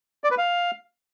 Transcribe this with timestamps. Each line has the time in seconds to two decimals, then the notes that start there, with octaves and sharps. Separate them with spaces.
0.24 D5
0.31 B4
0.38 F5